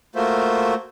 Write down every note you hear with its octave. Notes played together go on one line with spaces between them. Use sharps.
A3 A#3 F4 F#4 C5 E5